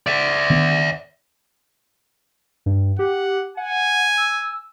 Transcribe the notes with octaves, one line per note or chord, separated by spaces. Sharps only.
D5 E5
D#3 B3 D4
G2
G4 F#5
F#5 G#5
E6